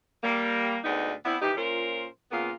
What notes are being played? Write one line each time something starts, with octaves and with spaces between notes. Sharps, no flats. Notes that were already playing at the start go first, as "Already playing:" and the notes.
G3 A#3
D2 G#2 B3 D#4 D5
B3 C4 D4 E4
D#3 E3 D#4 G4
A#2 C#4 F4 A#4 C5
A#2 C#3 A#3 B3 F4